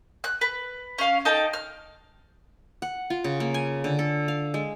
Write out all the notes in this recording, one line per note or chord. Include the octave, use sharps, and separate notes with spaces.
F#6
B4
C#4 F5
D#4 A4 G5 A5
F6
F#5
F4
C#3
A#3
G#5
D3
A4
F5
G#3